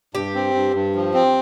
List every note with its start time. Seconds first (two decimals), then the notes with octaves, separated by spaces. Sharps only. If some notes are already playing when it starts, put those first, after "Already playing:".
0.14 G2 G4
0.35 C4
0.54 G2
0.74 G2
0.95 F3
1.14 C4